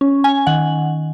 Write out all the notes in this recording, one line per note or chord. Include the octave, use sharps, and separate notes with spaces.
C#4
G#5
D#3 F#5